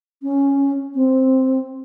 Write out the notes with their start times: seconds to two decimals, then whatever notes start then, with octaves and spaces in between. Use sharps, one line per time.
0.23 C#4
0.95 C4